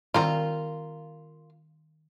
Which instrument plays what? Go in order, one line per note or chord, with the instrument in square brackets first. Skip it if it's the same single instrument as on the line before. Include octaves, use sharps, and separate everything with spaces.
[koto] D#3 G3 C4 [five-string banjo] F4 A#4